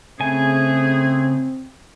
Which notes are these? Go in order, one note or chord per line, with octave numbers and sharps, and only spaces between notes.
C#3 A3 C4 G#4 G#5